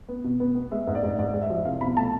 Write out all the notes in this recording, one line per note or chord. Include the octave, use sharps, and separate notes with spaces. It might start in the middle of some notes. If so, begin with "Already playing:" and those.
B3
B2
B3
B3
G#3 E5
G#2
D5
G#2
G#2 D5
G#3
E5
F3
C2 F5
B2 B5
A3 A5